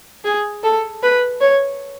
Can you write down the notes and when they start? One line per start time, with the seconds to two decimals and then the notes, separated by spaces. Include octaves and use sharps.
0.25 G#4
0.63 A4
1.03 B4
1.41 C#5